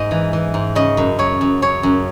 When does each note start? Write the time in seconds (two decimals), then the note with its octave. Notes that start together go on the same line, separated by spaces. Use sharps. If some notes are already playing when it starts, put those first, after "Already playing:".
Already playing: G#2 D#5
0.11 E3
0.33 E3
0.54 G#2
0.75 C#3 D#5
0.97 F#2
1.19 F#2 C#5
1.41 F#2
1.62 F#2 C#5
1.83 F#2